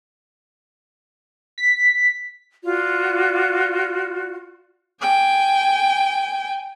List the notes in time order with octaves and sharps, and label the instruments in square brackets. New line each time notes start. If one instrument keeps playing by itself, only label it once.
[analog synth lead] B6
[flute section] F4 F#4 D5
[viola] G5 G#5